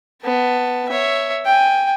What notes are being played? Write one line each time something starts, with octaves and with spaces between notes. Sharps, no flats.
B3 A5
C#5 E5
G5 G#5